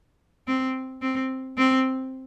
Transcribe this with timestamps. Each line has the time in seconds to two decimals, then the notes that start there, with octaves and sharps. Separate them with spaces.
0.47 C4
1.02 C4
1.57 C4